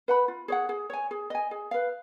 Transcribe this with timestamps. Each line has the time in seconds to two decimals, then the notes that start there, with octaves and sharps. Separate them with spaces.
0.08 B4 F#5 B5
0.28 F4
0.48 G#4 C#5 F#5
0.69 G#4
0.90 C#5 G#5
1.11 G#4
1.30 D#5 G#5
1.51 G#4
1.71 B4 F5